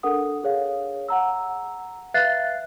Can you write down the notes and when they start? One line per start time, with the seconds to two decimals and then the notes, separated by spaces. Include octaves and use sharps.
0.03 D4 A4 A#4 F#5 D#6
0.44 G#4 C#5 F5
1.08 F#5 A#5 E6
2.14 B4 E5 F5 F#6 A6 C7